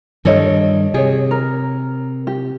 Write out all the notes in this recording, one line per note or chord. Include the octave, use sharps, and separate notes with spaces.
G2 D#3 G3 A4 C#5 D#5
C3 G#4 C#5
A#4
G4